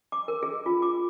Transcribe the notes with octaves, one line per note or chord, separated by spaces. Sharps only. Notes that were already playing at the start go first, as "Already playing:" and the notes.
D6
A#4
G#4
F4
D6